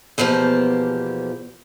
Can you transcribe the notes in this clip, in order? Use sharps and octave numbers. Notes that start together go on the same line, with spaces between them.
E2 B2 F3 A#3 G4